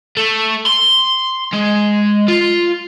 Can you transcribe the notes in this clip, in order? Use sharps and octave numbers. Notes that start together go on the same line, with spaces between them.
A3
C6
G#3
F4